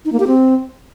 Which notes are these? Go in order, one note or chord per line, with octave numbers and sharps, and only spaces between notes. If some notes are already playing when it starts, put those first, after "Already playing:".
D#4
A#3
G4
C4